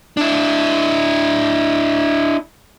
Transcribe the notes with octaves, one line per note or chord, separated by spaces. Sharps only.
D4 E4